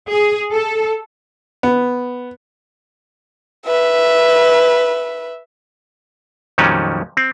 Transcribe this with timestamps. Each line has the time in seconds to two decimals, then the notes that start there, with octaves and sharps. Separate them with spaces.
0.10 G#4
0.52 A4
1.63 B3
3.66 B4 E5
6.58 F2 A#2 D#3 F#3 G3 C#4
7.17 C4